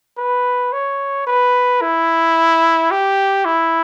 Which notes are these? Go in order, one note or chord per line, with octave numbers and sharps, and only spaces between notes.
B4
C#5
B4
E4
G4
E4